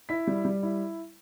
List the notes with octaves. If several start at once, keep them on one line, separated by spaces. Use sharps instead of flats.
E4 B6
G3
G3
E4